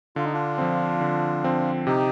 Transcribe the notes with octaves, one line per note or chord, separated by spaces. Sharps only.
D3 F4
D#4
D4 F4
F3 C4
D3
F3 C4
C3 D#4 G4